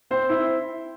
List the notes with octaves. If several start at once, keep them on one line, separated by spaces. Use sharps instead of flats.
C4 C5
E4